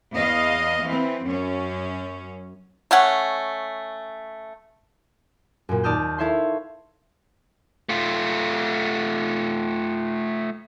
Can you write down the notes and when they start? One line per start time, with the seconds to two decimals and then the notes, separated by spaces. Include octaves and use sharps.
0.14 E2 D#5 F5
0.85 E3 C4
1.26 F#2 C#4
2.91 A3 C#4 F#5
5.69 F#2 A#2
5.83 D#2 D5 A5 D#6 F6 G6
6.18 E4 A4 C#5 E5 F5 C6
7.89 A3 F4